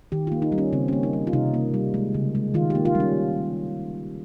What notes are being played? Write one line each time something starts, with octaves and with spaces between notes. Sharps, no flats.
D#3 G4
A#3 F4
D#4
G3
C#4
C#3 C4
A#3 C#4
D#4
G3
F4
C3 D#4
A#3
G3
G#3
C#3
G#3
D#3 F4
A#3 G4
F4
G3
C#4